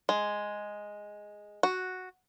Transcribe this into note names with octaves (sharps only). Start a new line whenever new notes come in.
G#3
F#4